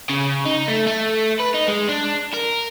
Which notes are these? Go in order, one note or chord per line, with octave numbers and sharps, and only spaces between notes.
C#3
D#4
A3
A3
B4
D#4
G#3
D4
A#4